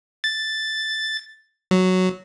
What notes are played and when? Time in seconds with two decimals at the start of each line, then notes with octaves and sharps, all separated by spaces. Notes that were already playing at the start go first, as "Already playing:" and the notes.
0.24 A6
1.71 F#3